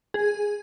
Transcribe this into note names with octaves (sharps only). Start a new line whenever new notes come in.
G#4